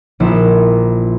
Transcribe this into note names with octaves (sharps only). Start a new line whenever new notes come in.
A#1 E4